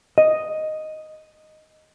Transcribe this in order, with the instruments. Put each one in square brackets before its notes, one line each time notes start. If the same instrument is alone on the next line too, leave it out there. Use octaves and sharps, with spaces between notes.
[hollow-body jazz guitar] D#5